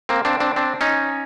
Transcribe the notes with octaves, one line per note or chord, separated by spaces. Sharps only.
A#3 C4
C4 D4
C4 D4
C4 D4
C#4 D#4